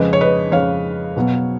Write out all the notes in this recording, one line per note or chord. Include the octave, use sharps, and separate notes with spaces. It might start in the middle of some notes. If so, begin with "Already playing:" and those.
Already playing: F2 C#3 G#3 B4 D#5
C#5
B4 D#5
F2 C#3 G#3 C#5 F5
B2 F#3 B3